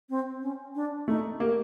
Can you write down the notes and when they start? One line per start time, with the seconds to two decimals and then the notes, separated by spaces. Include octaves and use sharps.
0.09 C4
0.42 C#4
0.75 D4
1.08 A3 D#4
1.40 A#3 G4